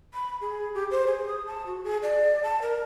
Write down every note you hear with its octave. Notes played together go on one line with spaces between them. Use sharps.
B5
G#4
G4
C5
G#4
D#6
A5
F#4
G#4
D5
A5
A#4